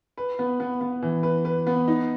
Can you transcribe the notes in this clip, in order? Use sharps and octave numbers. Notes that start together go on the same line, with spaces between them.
B4
B3
B3
B3
E3
B4
B4
B3
D#4